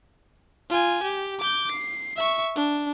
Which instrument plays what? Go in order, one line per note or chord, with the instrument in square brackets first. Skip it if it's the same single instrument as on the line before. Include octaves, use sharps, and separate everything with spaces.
[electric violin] F4 G#5
G4
D6 G6
C7
E5 C#6
D4